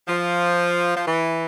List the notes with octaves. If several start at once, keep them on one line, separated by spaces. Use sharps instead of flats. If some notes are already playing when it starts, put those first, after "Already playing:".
F3
F3
E3